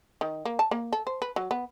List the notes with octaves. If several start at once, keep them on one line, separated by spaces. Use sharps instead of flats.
D#3
A#3
A5
A#3
A4
C5
B4
F#3
B3